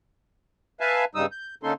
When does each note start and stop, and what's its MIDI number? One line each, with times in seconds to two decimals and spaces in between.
0.81 1.05 71
0.81 1.05 76
0.81 1.05 77
0.81 1.05 80
0.81 1.05 81
1.15 1.26 43
1.15 1.26 49
1.15 1.26 55
1.15 1.26 63
1.15 1.26 87
1.15 1.26 88
1.32 1.55 91
1.63 1.73 50
1.63 1.73 58
1.63 1.73 61
1.63 1.73 63
1.63 1.73 69
1.63 1.73 84